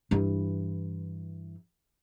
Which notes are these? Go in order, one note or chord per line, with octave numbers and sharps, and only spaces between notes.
G2 E3